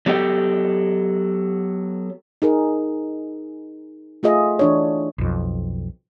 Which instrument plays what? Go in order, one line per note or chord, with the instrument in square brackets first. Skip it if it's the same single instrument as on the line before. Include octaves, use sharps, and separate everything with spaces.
[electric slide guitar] F#3 B3 G4 A4 D#5 G5
[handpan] D#4 G#4 A#4
A3 F4 G#4 D#5 E5
E3 D4 C#5
[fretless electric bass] B1 F2